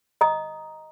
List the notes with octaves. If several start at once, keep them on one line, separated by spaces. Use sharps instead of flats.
D#5 A#5 D#6